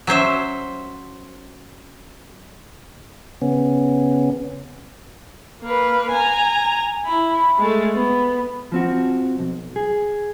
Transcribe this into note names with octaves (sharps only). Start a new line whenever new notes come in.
F#3 C#4 C5 E5
C#3 B3 C#4
A#3 B4
G#5 A#5
E4 B5
G#3 A3
B3
F3 C4 F#4
B1
G#4